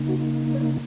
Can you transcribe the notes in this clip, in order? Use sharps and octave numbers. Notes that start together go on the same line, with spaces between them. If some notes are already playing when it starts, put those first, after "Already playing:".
Already playing: C#3 A#3 D#4
F#4
C#5